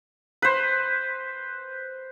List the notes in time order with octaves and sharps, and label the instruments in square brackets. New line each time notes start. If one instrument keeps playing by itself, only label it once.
[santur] B4 C5